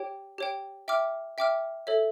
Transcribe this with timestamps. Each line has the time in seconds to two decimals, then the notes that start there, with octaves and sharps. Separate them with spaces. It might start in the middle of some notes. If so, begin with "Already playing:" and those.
Already playing: G4 C#5 G5
0.38 G4 C#5 G5
0.88 E5 G5 D6 F6
1.38 E5 G5 D6 F6
1.87 A4 C#5 E5